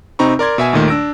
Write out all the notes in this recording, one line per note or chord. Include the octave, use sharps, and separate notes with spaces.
C3 C4 D#4 A#5 B5 C#6
A#4 D5 C6 G#6
B2 E5 G#5
D#2 A#2 D#3 A3
D4 E6 A#6 D7